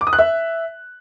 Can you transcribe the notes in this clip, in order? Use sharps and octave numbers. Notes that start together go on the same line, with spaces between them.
D6
D#6
F#6
E5